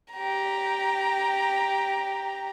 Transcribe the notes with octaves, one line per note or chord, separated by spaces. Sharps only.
G4 A#5